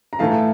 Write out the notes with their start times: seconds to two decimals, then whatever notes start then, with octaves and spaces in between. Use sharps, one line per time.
0.13 A#5
0.19 A2 E3 A3 E4 F5 A5